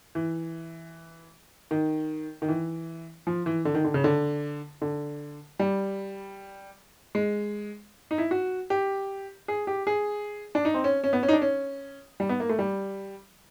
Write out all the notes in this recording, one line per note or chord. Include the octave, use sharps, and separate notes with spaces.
E3
D#3
D#3
E3
F3
E3
D3
D#3
D3
C#3
D3
D3
G3
G#3
D#4
E4
F#4
G4
G#4
G4
G#4
D4
D#4
C4
C#4
C#4
B3
C#4
D#4
D4
C#4
G3
B3
A#3
A3
G3